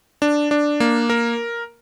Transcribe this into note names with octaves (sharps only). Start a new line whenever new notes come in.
D4
D4
A#3
A#4